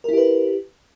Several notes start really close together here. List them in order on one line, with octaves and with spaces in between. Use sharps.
A#4 E4 G4 B4